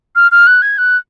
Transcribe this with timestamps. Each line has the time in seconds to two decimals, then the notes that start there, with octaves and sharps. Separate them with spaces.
0.16 F6
0.32 F6
0.47 F#6
0.62 G#6
0.78 F#6